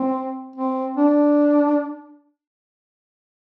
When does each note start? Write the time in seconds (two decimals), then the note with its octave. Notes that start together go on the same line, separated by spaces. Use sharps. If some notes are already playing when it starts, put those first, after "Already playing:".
Already playing: C4
0.56 C4
0.97 D4